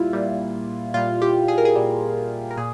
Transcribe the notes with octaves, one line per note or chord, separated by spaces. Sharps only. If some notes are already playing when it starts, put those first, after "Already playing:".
Already playing: A#2 G3 E4 F4
A#2 G3
A#2 G3 F4
G4
G#4
A#4
G#4
A#2 G3
A#4
A#2 G#4